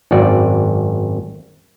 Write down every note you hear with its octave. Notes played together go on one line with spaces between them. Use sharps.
G#1 F#2 F#4 D5